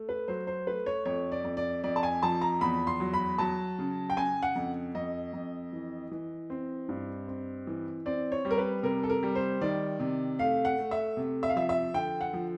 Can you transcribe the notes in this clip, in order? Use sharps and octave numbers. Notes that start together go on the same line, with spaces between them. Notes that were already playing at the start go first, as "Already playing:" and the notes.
Already playing: A3
B4
F#3 C5
C5
A3 B4
C#5
F2 C#5
D5
F2
D5
F2 D5
A5
G#5
F3 A5
A#5
E2 B5
C6
F#3
B5
F#3 A5
C#3
G5
C#3 G#5
F#5
F2
F2 D#5
F2
E3
E3
C4
G2
C4
E3
C4 D5
C#5
G3
A#4
B4
C3 A#4
A4
A#4
G3
C5
D#3 D5
C3
A3 F5
F#5
A3
E5
C3
E5
F5
F3 E5
E5
D3 G5
F#5
F3